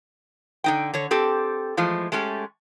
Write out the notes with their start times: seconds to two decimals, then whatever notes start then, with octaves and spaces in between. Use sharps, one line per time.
0.64 D3 D#4 G5
0.94 D3 C#5
1.11 C4 G4 A4
1.77 E3 F3 G#3 A3
2.12 G#3 A3 C#4 G4